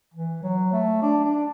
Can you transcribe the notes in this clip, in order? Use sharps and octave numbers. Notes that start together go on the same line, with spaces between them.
E3
F#3
A3
D4
D4